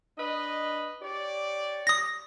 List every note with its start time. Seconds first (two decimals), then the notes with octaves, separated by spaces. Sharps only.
0.18 D4 B4 D#5
1.02 G4 C#5 D5
1.87 D#6 A#6